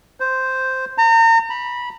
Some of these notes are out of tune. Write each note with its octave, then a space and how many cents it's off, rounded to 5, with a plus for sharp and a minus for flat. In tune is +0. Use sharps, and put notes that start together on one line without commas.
C5 -5
A#5 -35
B5 -20